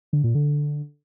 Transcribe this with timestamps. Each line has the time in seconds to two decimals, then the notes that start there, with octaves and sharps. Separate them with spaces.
0.13 D3
0.24 A#2
0.35 D3